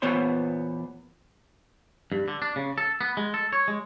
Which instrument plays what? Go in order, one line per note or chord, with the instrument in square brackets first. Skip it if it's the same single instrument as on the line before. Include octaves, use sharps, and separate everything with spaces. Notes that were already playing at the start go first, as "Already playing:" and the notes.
[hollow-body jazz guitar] E2 A#2 B3 C5 C#5 C6
[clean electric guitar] G2
D3
D4
C#3
A4
B3
G#3
A4
C#5
G#3